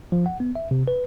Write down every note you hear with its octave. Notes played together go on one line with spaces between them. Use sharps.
F3
F#5
B3
E5
C3
B4